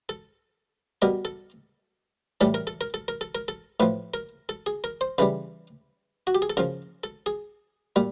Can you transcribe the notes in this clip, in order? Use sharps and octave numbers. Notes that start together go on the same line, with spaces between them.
A4
B2 G3 A#4
A4
A2 E3 G3 A4
A#4
A4
A#4
A4
A#4
A4
A#4
A4
A2 F3 B4
A#4
A4
G#4
A#4
C5
C#3 E3 G3 B4
F#4
G4
G#4
A4
C#3 F3 A#4
A4
G#4
A#2 G3